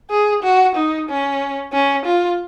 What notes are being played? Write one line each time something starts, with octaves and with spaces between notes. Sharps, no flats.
G#4
F#4
D#4
C#4
C#4
F4